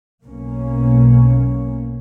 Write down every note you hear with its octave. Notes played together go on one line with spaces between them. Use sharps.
B1 B2 A#3 C#4